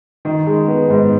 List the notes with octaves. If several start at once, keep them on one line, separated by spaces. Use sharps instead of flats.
D#3
G#3
B3
G#2